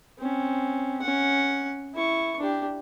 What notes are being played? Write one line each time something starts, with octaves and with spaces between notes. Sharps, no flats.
C4 C#4
C#4 F#5
E4 C#6
D4 G4